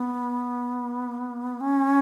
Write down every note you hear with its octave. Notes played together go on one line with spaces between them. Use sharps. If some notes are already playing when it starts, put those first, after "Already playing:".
Already playing: B3
C#4